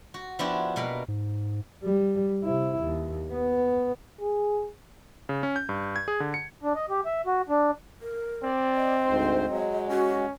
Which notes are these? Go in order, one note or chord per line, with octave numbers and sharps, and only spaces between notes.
F#4
F3 B3 D4 E4 F#4 G4
B2 A#3 F5 B5
G#2
G3
C3 E4
D#2
B3
G#4
C#3
C#4
G6
G2
G#6
G#4
D3
C#7
D4
D#5
G4
E5
F#4
D4
A#4
C4 D5
D#5
D2 G#2 C5
F#3 G#3
C#4 F#4